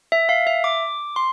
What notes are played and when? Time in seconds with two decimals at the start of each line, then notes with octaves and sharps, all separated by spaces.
0.12 E5
0.29 F5
0.47 E5
0.64 D6
1.16 C6